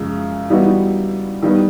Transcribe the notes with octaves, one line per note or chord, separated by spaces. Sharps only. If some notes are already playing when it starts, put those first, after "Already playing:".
Already playing: F#2 C#3 F3 G#3
E3 G3 B3 D#4 F#4
D#3 G3 B3